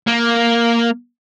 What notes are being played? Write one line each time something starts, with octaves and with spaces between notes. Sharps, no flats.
A#3